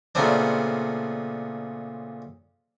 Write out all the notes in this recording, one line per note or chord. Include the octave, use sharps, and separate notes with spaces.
A#2 C#3 A3 B3 C4 D4